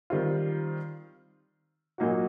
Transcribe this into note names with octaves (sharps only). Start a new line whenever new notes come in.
D#3 G3 C4 F4
A#2 F#3 A#3 D#4 F#4